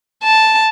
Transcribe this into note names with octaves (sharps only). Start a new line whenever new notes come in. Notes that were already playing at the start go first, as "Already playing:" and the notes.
A5